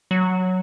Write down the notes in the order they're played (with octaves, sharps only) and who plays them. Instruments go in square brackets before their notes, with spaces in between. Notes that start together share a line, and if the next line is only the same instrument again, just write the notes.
[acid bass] F#3